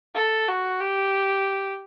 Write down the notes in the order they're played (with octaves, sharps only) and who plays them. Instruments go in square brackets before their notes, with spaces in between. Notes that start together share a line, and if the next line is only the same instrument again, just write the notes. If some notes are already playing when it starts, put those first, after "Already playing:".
[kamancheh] A4
F#4
G4